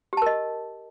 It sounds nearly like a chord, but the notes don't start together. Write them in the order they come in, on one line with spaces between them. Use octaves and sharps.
G4 A5 A#4 D#5